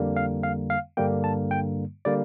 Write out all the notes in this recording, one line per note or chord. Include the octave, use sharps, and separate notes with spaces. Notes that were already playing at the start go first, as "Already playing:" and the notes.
Already playing: F2 D3 G3 A#3
F5
F5
F5
G2 D3 G3 A#3 G5
A5
G5
D3 G3 A#3 D5